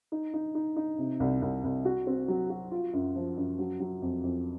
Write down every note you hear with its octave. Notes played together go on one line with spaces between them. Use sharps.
D#4
D#4
D#4
D#4
C3
C2
C2
C2
F#4
C4
F#3
F#4
F4
F#2
F3
F#2
F#3
F#3
F2
F2